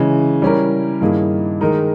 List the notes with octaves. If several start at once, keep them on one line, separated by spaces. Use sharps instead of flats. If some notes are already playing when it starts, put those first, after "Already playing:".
Already playing: C#3 E3 G#3
G3 C#4 E4 A#4
G2 D#3 A#3 E4 G#4
D#3 G#3 D#4 A#4